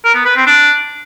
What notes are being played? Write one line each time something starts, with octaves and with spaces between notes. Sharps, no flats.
A#4
B3
B4
C4
D4